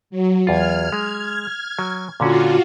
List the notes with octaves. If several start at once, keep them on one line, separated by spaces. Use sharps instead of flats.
F#3
E2 F4 F6 G#6
G#3
F#3
A#2 D3 C#4 F4 F#4